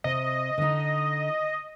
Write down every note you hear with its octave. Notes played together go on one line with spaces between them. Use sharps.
C3 D#5
D3 D#4